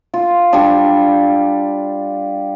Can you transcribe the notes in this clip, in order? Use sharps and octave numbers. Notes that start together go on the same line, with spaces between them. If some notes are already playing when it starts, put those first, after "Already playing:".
F4
G3 D4